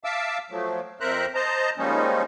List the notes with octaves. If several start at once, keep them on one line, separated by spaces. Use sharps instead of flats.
E5 F5 A5 D6 E6
F3 F#3 A3
F2 A#4 C5 E5 A#5 F#6
C5 D#5 A5 A#5
F3 G3 G#3 A#3 C#4 D#4